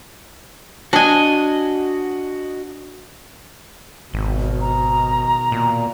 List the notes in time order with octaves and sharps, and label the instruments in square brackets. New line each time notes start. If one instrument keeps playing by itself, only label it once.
[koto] D4 G#5 [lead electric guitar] F#4 D#5
[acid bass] G#1 [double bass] B2 D#3
[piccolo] A#5
[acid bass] A#2